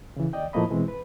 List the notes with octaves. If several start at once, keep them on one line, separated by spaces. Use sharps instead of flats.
C#3 E3
D#2 D5 D#5 G5
A2 F3 A3 A#3 D#5 B5
B2 E3 G#3 C4
B4